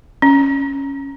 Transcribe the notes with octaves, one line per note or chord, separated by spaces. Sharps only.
C#4